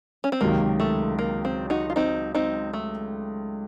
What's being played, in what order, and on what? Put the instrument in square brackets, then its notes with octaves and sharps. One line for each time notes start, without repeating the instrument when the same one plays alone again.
[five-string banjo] C#4
C4
[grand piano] C#2 C3 D#3 F#3 [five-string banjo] A#3
[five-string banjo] A3
A#3
C4
D#4 F#4
F4
C4 D#4
C4 D#4
A3